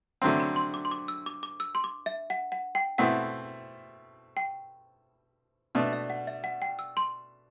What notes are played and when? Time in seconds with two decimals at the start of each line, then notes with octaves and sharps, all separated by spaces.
0.22 D3 F#3 A3 C4 C6
0.40 B5
0.56 C6
0.74 D6
0.85 C6
0.91 D6
1.08 E6
1.26 D6
1.43 D6
1.60 E6
1.75 C6
1.84 D6
2.06 E5
2.30 F#5
2.52 F#5
2.75 G5
2.98 B2 A3 C4 E4 F#5
4.37 G5
5.75 B2 A3 D4 A5
5.93 E5
6.10 F#5
6.27 E5
6.44 F#5
6.62 G5
6.79 E6
6.97 C6